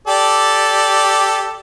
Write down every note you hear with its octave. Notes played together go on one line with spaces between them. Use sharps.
G4 A4 D5